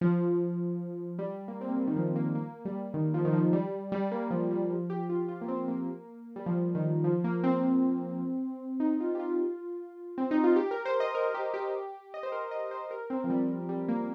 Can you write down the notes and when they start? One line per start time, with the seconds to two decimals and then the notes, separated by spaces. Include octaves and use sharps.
0.01 F3
1.19 G3
1.48 A#3
1.61 C4
1.69 A#3
1.77 G3
1.87 D#3
1.96 F3
2.16 A#3
2.35 A#3
2.65 G3
2.94 D#3
3.14 F3
3.25 D#3
3.33 F3
3.53 G3
3.92 G3
4.11 A#3
4.31 F3
4.51 G3
4.70 F3
4.90 G4
5.09 F4
5.28 F4
5.41 A#3
5.48 C4
5.68 A#3
6.36 G3
6.46 F3
6.75 D#3
7.04 F3
7.24 A#3
7.44 C4
8.80 D#4
9.00 F4
9.15 G4
9.19 F4
10.18 C4
10.31 D#4
10.44 F4
10.56 G4
10.71 A#4
10.85 C5
11.00 D#5
11.15 A#4
11.34 G4
11.54 G4
12.14 D#5
12.23 C5
12.32 A#4
12.51 D#5
12.71 C5
12.91 A#4
13.10 C4
13.24 F3
13.30 G3
13.69 G3
13.89 A#3